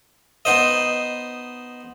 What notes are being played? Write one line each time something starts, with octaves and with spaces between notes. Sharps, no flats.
B3 D#4 C5 D#5